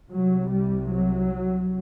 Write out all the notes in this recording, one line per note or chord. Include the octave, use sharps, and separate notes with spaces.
C2 C3 F#3
G3
F#3